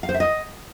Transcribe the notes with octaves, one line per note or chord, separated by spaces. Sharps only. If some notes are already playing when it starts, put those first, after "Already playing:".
F5
C5
E5
D#5